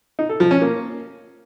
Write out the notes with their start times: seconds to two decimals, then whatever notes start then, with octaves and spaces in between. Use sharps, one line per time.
0.19 D#4
0.29 A4
0.40 F3
0.51 C#4
0.62 A#3